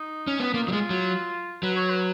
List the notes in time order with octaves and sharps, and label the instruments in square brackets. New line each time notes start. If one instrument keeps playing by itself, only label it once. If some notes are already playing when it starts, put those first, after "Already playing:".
Already playing: [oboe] D#4
[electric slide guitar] C#4
B3
[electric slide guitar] A#3 [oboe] F4
[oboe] D#4
[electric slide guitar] F#3
[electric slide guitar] G#3 [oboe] F4
[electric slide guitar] F#3
[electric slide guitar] F#3 [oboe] B4
[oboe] C#5
B4